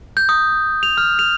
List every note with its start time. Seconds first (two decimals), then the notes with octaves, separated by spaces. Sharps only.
0.17 G6
0.29 D#6
0.83 F7
0.98 F6
1.19 F7